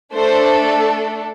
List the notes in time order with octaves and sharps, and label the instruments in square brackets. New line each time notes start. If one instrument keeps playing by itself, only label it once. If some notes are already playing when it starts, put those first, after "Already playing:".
[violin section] A3 D4 A4 C5